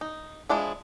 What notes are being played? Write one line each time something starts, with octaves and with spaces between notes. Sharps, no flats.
D#4
F3 G#3 D4 E4